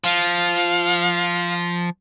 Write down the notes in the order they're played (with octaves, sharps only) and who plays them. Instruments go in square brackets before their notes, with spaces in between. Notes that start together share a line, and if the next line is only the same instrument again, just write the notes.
[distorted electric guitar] F3 [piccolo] F5